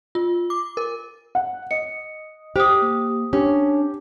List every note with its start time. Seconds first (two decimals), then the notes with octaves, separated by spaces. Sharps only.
0.15 F4
0.50 D6
0.77 A#4
1.35 F#5
1.71 D#5 C#7
2.56 G4 C5 G5 D#6
2.82 A#3
3.33 C#4 D4 G4